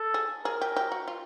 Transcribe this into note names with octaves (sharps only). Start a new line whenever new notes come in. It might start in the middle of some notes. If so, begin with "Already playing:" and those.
Already playing: A4
G#4
G#4 A#4
G4
G4
F#4
F4